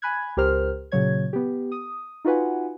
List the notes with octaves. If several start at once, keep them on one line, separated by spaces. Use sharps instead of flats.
G#5 B5 F#6 G#6
C#2 G4 A#4 C5 F6
A#2 C#3 F#3 C#5 G#6
B3 G4
D#6
D#4 F4 F#4 B4 F#5 G#5